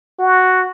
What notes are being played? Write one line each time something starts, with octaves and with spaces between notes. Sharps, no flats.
F#4